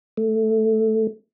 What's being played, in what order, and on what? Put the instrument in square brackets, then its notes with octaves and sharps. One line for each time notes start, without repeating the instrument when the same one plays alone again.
[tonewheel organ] A3